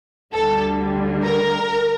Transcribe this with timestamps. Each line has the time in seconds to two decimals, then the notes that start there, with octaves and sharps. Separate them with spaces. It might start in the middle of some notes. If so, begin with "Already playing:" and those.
0.34 D2 D3 G3 A4
1.23 A#4